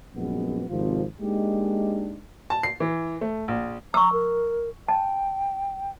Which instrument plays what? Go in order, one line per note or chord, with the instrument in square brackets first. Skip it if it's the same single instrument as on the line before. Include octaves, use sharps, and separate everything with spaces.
[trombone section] A#1 F#2 G#3 B3
G#1 C3 F3 F4
G#3 A#3 D4 D#4 G4
[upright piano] A5
C7
E3
A3
A#1
[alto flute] A#5 [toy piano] C#6 E6
[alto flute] A#4
[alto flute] G5 [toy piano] A5